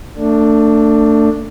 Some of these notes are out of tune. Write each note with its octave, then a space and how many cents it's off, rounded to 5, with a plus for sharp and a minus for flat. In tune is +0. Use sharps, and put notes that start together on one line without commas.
A3 +30 D4 +0